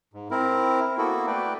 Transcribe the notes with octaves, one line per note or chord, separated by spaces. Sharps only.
G#2
C4 E4 A#4
A#3 B3 E4 F#4 A4
A3 B4 D5 G5